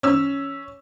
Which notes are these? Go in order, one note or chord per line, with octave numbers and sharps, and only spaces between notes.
C#4 E6